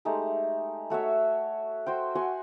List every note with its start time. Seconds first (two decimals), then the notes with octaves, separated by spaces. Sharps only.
0.05 G#3 A3 D#4 G4
0.90 A3 F#4 C#5 E5
1.86 F#4 C5 G5
2.15 F#4 F#5 G#5 C6